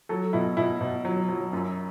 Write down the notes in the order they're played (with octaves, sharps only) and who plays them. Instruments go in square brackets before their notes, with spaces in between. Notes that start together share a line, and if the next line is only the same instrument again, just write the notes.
[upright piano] F#3 A4
B2 E4
B2 E4
B2
F#3
F#3
F#2